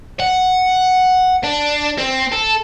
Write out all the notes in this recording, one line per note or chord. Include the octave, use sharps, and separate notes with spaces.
F#5
D4
C4
A4